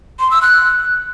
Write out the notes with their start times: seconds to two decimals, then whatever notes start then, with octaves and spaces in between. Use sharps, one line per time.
0.20 C6
0.31 E6
0.42 F#6